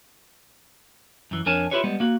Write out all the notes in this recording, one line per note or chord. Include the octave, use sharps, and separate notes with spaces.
F#2 E3
F2 D4 A#4 C#5 G#5 A5
E4 F4 G4 B4 C#5
G3 G#3 B3
A#3 F#4